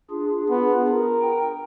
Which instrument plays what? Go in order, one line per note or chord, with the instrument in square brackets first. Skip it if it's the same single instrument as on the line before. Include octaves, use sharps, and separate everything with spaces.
[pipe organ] D4 F4 G#4
[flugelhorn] B3
A#4
[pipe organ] G5